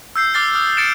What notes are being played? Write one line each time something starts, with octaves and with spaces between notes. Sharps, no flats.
E6 G6 C7
D6 F6 A6 C7 G7
D#6 F6
G6 A6 C#7 D7 E7